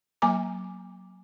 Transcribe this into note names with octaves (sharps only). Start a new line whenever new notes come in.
F#3 A#3 G#5 A#5 D6